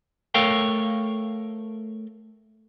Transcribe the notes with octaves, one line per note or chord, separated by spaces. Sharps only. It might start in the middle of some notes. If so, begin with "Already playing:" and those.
A3 A4 A#4 C#5 F5 G5